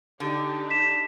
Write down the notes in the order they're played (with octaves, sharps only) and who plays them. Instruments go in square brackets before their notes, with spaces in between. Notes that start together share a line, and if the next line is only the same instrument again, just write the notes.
[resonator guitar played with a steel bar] D3 [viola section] D4 D#4 G4
[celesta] B6 E7